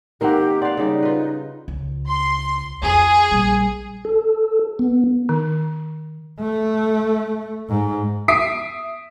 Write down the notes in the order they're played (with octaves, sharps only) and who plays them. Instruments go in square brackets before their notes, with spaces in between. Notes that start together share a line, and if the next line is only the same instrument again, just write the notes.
[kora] D#3 A#3 C4 [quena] G4 [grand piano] A#4 F#5
[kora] D5 F5 [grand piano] F#5 C6
[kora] C#3 G3 [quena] D#4
[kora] F4 B4
[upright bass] C#2
[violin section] C6
[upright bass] F2 F4 [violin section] G#4
[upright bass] A#1 G3
[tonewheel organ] A4
B3
[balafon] D#3
[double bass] A3
G#2
[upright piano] E5 D#6 B6 C7 D7